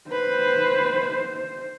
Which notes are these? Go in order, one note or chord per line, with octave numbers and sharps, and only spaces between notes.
B4 C5